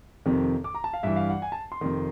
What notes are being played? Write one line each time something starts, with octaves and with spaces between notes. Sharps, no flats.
F2 C3 D#3
D6
A#5
A5
F5
G2 E3 E5
F5
F#5
G#5
A5
C6
F2 C3 D#3